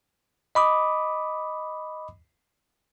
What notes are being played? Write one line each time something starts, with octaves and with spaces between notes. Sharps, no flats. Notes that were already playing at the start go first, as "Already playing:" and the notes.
D#5 B5 D6 D#6